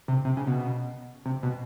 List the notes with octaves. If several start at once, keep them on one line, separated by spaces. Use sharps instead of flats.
C3
C3
C#3
B2
C3
B2